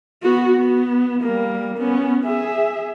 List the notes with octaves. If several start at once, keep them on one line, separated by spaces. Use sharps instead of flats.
B3 F#4
B3
G3 A#3
B3 C#4
G#4 E5